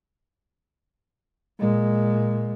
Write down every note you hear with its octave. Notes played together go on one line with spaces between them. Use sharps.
A#2 G#3